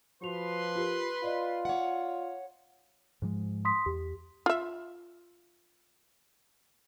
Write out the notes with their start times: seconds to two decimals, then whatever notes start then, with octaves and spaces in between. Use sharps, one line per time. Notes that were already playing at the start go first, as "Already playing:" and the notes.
0.23 F3 F#4 B4 C6 F7
0.76 F4 G4 A#4
1.24 F4 D5 D#5
1.65 C#5 F#5
3.22 G#2 F3 G#3
3.65 C6 D#6 B6
3.86 E2 G4
4.46 F4 E5